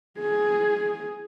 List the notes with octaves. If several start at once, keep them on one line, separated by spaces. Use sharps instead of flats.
G#4